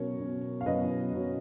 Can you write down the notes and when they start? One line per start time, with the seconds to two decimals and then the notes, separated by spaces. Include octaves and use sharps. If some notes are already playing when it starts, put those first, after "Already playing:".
Already playing: B2 F#3 C#4 A#4 C#5
0.19 B2 F#3 C#4
0.61 F5
0.66 B2 F#3 C#4 B4 D#5
1.13 B2 F#3 C#4